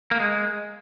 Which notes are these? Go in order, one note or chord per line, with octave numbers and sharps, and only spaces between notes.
A#3
G#3